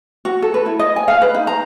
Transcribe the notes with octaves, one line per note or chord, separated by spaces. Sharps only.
F#4
A4
B4
E4
D#5
G#5
F5
B4
D#4
A#5